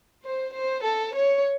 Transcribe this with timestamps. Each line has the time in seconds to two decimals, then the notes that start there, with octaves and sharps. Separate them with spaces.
0.23 C5
0.54 C5
0.84 A4
1.14 C#5